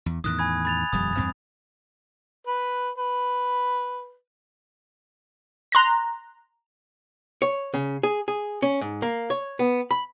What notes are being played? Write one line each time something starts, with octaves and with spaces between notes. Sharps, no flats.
E2
E2 A2 D#3 D#6 F#6
G#5 B5 G#6
B5 A6 F7
D#1 F2 G3 D#6
E2 G2 C4
B4
B4
A#5 C6 F#6 A#6
C#5
C#3
G#4
G#4
C#4
G#2
A#3
C#5
B3
B5